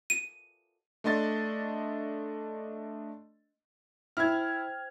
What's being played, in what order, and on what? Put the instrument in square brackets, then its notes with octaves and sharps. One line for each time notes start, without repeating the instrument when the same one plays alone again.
[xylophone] D#7
[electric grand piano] A3 D4 D#5 C6 A6
[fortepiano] E4 [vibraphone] C5 G5 [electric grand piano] F6 G#6